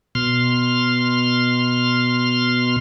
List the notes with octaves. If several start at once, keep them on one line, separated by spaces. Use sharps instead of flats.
B2 C6 F6